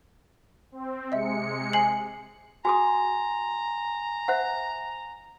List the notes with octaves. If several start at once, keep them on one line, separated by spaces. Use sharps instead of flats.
C4
C3 G#3 D#5 E5 C#7
G#5 C7 F#7
F#4 G#4 G#5 A#5 C6 D#6
C5 E5 F#5